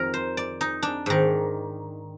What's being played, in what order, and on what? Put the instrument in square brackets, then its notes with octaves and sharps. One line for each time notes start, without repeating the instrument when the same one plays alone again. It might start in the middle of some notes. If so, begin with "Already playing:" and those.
Already playing: [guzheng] F2 D#3 A#4
C5
D5
D#4
D4
G#2 D#3